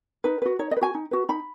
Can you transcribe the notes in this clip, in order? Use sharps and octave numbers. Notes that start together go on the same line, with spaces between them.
D#4 B4
F#4 B4
D#4 C#5
D#5
B4
F#4 G#5
D#4
F#4 B4
D#4 B5